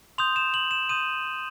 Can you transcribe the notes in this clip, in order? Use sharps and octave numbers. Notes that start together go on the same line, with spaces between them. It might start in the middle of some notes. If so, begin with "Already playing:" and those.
C6 D#6 G6 F7
E7
F#7
E7
C6 D#6 G6 D#7